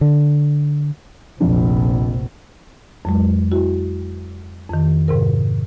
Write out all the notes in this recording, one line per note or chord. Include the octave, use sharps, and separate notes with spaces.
D3
F1 A#1 F2 D4
F2 F#3 G#3
E4 F#4
F2 D#3
G#2 C3 A#4